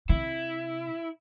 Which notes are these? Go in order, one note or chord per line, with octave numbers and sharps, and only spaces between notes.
C3 E4